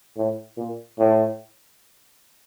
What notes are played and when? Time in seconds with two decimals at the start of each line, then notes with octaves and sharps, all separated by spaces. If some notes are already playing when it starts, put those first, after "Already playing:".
0.16 A2
0.57 A#2
0.98 A2